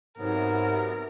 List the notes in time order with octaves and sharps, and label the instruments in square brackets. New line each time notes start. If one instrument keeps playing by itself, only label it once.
[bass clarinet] G#2 [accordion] C3 F#3 B3 [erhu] A#4